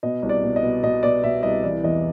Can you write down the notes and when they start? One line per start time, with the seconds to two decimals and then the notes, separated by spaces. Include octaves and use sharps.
0.03 B2 D#5
0.23 C2
0.29 D5
0.43 B2
0.56 D#5
0.63 B2
0.83 B2 D#5
1.03 B2 D5
1.24 B2 E5
1.43 C2 D#5
1.64 E3 D5
1.84 E2 D#5